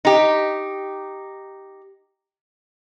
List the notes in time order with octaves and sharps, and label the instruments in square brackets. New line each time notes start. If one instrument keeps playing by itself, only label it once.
[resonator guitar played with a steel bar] D#4 G4